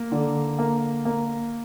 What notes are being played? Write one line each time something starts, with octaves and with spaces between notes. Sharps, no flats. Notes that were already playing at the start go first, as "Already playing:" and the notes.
Already playing: A#3
D3
A#3
A#3